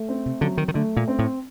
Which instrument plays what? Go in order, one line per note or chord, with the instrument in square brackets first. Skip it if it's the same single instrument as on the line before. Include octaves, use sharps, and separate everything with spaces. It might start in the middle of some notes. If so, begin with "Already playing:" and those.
Already playing: [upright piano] A3
C4
[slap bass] C3
[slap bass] D3 [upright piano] F#3
[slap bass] D#3
D#3
[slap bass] D3 [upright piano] A3
[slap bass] A#2
[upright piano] C4
[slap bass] A2